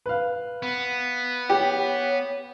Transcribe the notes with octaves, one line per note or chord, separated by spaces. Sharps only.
B4 F5
B3
G4 C#5